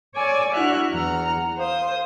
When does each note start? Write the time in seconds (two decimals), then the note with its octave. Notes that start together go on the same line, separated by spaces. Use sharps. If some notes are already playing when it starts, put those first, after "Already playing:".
0.15 C#5 D5 G#5 D6 E6
0.53 D4 E4 F#4 E5 F6 F#6
0.90 E2 F#5 A#5 F6
1.57 C5 F5 D#6